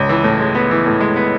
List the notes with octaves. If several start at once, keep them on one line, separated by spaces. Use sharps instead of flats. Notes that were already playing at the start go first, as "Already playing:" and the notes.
Already playing: C#2
E3
A2
G#3
B3
E3
A2
G#3
B3